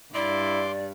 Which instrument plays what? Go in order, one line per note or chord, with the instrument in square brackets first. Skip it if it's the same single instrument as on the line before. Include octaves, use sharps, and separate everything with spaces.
[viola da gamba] G2 [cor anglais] E4 [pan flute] D5 [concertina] C6 D6